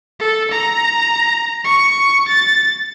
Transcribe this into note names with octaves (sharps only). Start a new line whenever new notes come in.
A4
A#5
C#6
A6